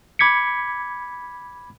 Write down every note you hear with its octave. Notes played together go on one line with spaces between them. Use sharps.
B5 D6 G#6 B6 C#7